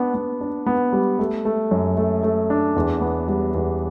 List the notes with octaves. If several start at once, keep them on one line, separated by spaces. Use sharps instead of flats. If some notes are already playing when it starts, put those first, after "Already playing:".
Already playing: B3 D4
B3
D4
B3
G3
A3
A3
F#2
A3
A3
D4
E2
B3
G3
E2